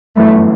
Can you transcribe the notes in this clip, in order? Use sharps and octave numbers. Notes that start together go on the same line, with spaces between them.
G1 F#2 E3 A3 B3